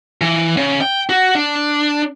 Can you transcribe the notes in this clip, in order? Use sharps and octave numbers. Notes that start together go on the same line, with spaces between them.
E3
C#3
G5
F#4
D4